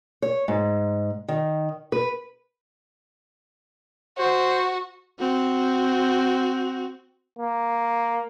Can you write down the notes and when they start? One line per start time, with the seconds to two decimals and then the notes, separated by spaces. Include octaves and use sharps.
0.22 C#5
0.48 G#2
1.28 D#3
1.92 B4
4.18 F#4 C5
5.19 C4 F#4
7.39 A#3